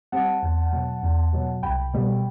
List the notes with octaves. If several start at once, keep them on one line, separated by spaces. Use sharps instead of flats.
G3 C4 F#5 A5
E2
B2 F#3
E2
B2 F#3
C2 G5 B5
B2 G3